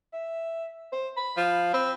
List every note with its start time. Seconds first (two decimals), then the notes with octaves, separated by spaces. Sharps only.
0.13 E5
0.92 C5
1.17 B5
1.37 F3
1.74 C4 B5